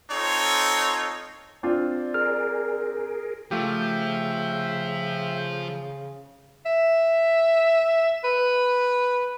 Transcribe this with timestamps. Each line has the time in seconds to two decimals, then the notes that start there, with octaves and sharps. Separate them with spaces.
0.11 C4 D#4 F4 A4 C#5
1.63 C4 D4 F4 D5
2.14 G#4 A#4 F6
3.51 C#3 F3 A3 F4 G4 E5 G5
6.66 E5
8.24 B4